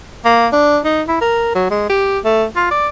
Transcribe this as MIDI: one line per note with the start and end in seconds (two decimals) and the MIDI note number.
0.25 0.47 58
0.53 0.80 62
0.85 1.02 63
1.08 1.18 64
1.21 1.52 70
1.55 1.67 54
1.71 1.85 56
1.89 2.19 67
2.25 2.46 57
2.56 2.69 65
2.71 2.88 74